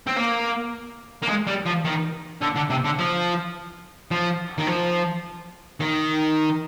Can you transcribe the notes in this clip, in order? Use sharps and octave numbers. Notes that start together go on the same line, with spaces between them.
C4
A#3
A#3
G#3
G3
F3
D#3
D3
D3
C3
D3
F3
F3
D#3
F3
D#3